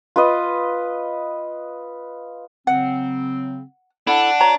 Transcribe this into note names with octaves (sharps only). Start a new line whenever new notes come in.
F4 B4 D#5
C#3 F#3 C4 F#5
D4 E4 A4 F#5 B5
F#4 C#5 A#5